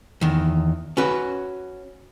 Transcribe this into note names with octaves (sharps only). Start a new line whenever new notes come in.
E2 D#3
C#4 F#4 B4